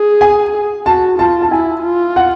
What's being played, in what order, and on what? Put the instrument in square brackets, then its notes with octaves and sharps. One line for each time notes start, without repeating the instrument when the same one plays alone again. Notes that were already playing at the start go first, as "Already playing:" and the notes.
Already playing: [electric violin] G#4
[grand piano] G#5
[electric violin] F#4 [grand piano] A5
[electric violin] F4 [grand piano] A5
[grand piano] A5
[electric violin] E4 [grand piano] G#5
[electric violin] F4
[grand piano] F#5